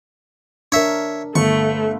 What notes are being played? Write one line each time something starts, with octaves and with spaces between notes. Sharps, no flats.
D4 A#4 C#5 E5
G1 A3 C#6